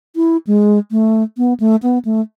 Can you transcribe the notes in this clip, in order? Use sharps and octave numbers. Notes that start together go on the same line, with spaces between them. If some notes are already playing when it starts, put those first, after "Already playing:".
E4
G#3
A3
B3
A3
B3
A3